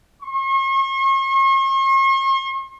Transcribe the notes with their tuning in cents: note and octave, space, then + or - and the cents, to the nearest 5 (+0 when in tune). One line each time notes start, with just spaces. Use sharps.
C#6 -45